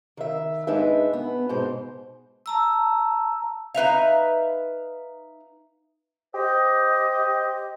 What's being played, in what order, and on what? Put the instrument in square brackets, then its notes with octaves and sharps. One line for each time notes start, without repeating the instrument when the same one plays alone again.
[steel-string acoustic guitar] D#3 E5
G#2 G#3 D4 D#4 B4 E5
B3
G#2 B2 C5
[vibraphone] A5 A#5 E6
[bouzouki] D#4 B4 E5 F5
[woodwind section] G4 C5 D#5